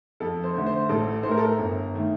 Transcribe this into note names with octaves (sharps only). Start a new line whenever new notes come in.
F2 A4
C5
D3 A3
C5
A1 A4
A2 A3 C5
A#4
A4
A#4
G1
D#3 A3